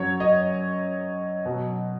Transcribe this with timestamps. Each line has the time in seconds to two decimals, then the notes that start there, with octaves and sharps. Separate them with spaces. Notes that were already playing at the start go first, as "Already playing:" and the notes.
Already playing: F#2 F#3 C#5
0.20 D#5
1.45 B2 F#3